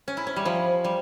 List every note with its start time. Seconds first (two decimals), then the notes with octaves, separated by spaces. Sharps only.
0.08 C#4
0.17 E4
0.27 C#4
0.36 G3
0.45 F3
0.84 G3